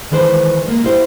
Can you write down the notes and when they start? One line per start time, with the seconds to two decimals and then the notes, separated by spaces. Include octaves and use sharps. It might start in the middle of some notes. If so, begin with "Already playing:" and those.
0.11 D#3 E3 G#3 B4 C5
0.66 G#3 A#3
0.84 E4 G4 C5